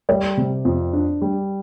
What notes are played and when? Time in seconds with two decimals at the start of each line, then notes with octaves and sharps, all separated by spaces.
0.09 G3 D5
0.37 C3
0.65 F2
0.93 D4
1.22 G3